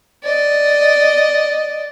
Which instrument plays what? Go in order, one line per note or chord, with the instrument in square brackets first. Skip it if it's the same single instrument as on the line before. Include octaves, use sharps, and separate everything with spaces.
[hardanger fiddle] D5 D#5